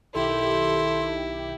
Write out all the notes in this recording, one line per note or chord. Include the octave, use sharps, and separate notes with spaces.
B1 D#3 E4 G4 A4 C6